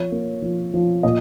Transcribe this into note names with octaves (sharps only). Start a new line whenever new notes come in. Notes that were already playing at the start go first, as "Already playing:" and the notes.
Already playing: F3 C#5
A#3
F3
F3
A#2 D#5